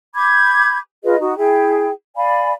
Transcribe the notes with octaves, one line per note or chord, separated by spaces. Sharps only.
B5 D6 G6 G#6
F4 G#4 B4 D#5
D#4 F#4
E4 G#4 G5
D5 F5 G#5 B5